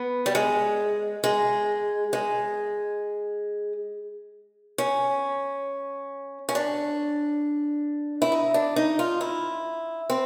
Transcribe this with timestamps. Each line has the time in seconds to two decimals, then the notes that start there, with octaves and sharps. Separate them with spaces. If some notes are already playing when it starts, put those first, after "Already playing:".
Already playing: B3
0.26 G3
0.35 G#3
1.24 G#3
2.13 G#3
4.78 C#4
6.49 C#4
6.55 D4
8.22 E4
8.32 D#4
8.54 D4
8.76 D#4
8.99 F4
9.21 E4
10.10 C4